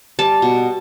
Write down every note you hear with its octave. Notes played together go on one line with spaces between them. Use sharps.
G3 A5
B2